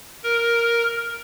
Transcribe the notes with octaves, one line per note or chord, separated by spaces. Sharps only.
A#4